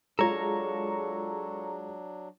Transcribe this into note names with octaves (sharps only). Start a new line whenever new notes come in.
F#3 G#3 D4 F4 A4 C#5 A#5